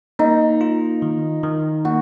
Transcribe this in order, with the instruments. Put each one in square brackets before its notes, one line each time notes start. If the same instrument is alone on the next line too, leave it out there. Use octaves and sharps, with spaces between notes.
[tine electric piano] A#3 [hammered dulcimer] D#4
[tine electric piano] F4
D#3
D#3
[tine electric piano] A#3 [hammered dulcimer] F#4